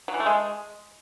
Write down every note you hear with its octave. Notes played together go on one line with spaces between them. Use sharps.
F#3
E3
A3
G#3